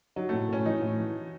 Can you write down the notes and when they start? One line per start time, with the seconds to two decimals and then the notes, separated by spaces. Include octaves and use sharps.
0.16 F#3 D#4
0.29 A2 A3
0.49 A2 C#4
0.65 E3 D#4
0.82 A2
0.98 E3